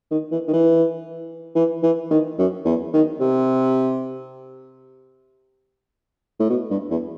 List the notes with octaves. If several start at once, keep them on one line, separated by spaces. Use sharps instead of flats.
D#3
E3
D#3
E3
E3
E3
D#3
F#2
E2
D#3
C3
A2
B2
G2
E2